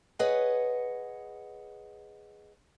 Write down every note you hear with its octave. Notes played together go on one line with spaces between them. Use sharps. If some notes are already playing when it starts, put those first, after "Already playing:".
G#4 B4 C#5 D#5 F#5